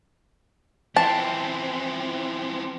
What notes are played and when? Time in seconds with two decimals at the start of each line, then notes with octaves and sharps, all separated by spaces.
0.96 E3 F3 C4 A5